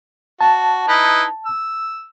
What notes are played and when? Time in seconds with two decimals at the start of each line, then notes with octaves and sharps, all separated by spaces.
0.41 F#4 A5
0.88 D#4 E4 B4
1.46 E6